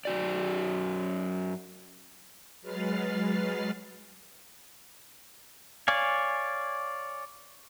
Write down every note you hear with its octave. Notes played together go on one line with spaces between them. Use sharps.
F#2 F#4 D5
F#3 G#3 B4 F6 A6 C7
C#5 D5 F5 G#5